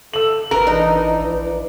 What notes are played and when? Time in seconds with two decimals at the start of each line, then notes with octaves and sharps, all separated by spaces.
0.14 A4 E6 F#7
0.51 G#1 A#4 B4 A#5
0.67 E3 D4 D#4
1.18 A#1